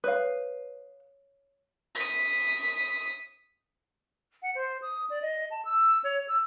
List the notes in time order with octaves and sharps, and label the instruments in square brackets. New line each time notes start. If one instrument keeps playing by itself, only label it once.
[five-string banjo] B4 F5 [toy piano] C#5 D#6
[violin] D#6 B6
[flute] F#5
C5
D#6
D5
D#5
A5
E6
C#5
E6